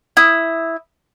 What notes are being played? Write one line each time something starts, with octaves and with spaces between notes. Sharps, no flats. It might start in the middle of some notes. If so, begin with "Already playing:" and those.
E4 D#6